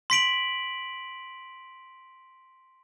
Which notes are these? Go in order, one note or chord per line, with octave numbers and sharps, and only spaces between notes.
C6 B6 D7 F#7